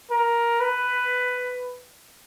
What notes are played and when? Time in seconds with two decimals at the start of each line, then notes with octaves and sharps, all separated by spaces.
0.11 A#4
0.60 B4